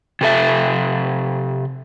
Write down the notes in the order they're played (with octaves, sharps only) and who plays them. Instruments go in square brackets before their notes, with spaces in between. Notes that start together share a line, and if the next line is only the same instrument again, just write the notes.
[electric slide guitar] C3 A4 E5